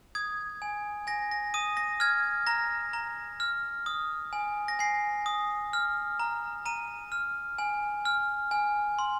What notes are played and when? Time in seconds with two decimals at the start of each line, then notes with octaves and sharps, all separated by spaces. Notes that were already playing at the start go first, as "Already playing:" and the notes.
0.15 D#6 G#6
0.62 G#5
1.07 G#5 A#6
1.31 A#6
1.54 D#6 D#7
1.77 A#6
2.00 F6 G#6
2.47 A#5 A#6
2.93 A#5
3.40 F6
3.86 D#6
4.33 G#5
4.68 A#6
4.79 G#5 C7
5.26 D#6
5.73 F6
6.20 A#5
6.66 A#5 D#7
7.12 F6
7.58 G#5
8.05 F6
8.51 G#5
8.99 C6